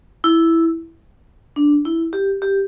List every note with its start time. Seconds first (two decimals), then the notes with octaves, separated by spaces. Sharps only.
0.24 E4
1.56 D4
1.85 E4
2.13 G4
2.42 G4